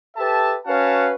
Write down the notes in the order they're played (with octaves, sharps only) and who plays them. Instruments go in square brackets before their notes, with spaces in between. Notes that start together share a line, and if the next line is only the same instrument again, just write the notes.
[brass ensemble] G4 A4 B4 E5 A5
C#4 F#4 B4 F5 F#5 A5